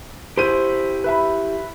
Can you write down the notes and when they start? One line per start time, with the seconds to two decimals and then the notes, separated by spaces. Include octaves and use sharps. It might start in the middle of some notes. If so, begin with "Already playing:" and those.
0.37 E4 G4 C5 D#7
1.04 B4 E5 B5